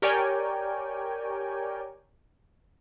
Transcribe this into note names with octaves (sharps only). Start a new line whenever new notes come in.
G4 A#4 C#5 D5 G5 G#5